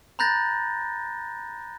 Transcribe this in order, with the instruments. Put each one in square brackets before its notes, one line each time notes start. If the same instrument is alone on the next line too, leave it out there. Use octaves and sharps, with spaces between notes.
[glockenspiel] A#5 B5 F#6 G6 A6 A#6